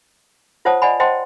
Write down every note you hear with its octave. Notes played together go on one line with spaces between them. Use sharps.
F4 C5 C#5 F#5 A5 D#6
D5 D#5 F#5 G#5 B5
C5 D#5 F#5 G5 A5 C6